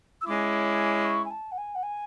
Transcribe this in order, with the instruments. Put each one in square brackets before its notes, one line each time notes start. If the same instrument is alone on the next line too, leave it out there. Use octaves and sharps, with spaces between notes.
[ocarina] E6
[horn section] G#3 C#4 E4 [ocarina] D6
[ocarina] C#6
G#5
A5
F#5
G#5
F#5
G#5